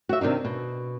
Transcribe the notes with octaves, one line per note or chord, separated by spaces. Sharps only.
F#4 E5
C3 D#3 D4 D#4
B2